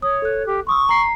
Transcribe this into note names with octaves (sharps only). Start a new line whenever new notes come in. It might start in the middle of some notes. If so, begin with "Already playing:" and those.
C#5 D#6
A4 F#6
G4
C6 C#6 D#6 E6
A#5 C7